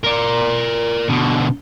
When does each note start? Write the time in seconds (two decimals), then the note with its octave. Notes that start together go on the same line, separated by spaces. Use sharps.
0.04 A#4 D5
1.09 B2 D3